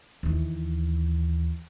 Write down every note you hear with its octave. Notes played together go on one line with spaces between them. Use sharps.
D#2 E3